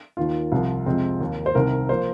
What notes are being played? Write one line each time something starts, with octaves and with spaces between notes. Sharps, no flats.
D#2 D#3 A#3 F4
C2 C3 F3
F2 C3 G#3 C4
D#2 D#3 A#3
C5
C2 C3 D#3 A#4
F3 A#3 C5